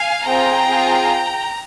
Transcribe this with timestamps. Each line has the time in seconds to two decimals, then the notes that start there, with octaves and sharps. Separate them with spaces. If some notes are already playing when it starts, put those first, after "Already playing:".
Already playing: F5 G#5
0.27 C4 F4 G#4 G5 A#5
0.68 C4 F4 G#4